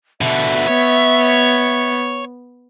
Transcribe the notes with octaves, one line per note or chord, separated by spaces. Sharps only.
B2 D3 E5
B3 C#5